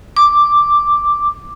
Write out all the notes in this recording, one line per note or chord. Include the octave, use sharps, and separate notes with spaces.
D6